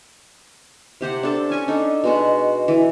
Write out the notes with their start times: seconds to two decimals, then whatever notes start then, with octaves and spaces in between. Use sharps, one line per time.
1.01 C3 G4 C5 F#5
1.23 D4 A4 A5
1.50 C#4 G#5 C#6
1.68 D4 D#4 A4
2.04 B2 G#3 F#4
2.68 E3